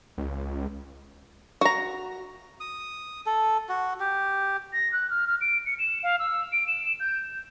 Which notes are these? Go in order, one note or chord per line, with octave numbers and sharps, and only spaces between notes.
C#2
F#4 A#5
D#6
A4
F#4
G4
A#6
F#6
F6
F6
D7
C#7
E7
F5
E6
D7
E7
G6